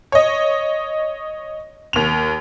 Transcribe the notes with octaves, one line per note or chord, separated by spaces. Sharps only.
C#5 D#5
D#2 F7